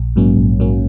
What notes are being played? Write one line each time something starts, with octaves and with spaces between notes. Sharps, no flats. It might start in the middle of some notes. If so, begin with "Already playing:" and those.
Already playing: A#1
G#2 F#3 A#3 C#4
A#1
G#2 F#3 A#3 C#4